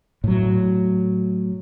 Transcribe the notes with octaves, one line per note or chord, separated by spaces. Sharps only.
A2 F#3